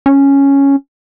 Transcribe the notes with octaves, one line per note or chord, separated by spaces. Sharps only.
C#4